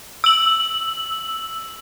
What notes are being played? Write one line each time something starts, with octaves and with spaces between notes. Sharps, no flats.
E6 F#7